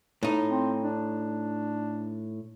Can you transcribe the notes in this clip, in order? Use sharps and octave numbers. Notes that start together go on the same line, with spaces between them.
A2 D#4
C4
D4